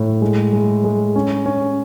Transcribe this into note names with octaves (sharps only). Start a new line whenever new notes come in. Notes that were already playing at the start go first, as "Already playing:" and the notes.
Already playing: A2
G#3
G#3
G#3
C#4
C#4